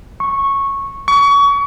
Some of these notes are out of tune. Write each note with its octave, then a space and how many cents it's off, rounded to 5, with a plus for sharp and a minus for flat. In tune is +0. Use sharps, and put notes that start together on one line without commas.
C#6 -10
C#6 +30